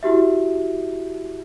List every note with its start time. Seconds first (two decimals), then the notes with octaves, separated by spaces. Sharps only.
0.03 E4 F#4 G4 E5